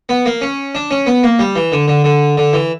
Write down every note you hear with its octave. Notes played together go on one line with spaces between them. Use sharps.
B3
A#3
C#4
D4
C#4
B3
A#3
G3
E3
D3
D3
D3
D3
E3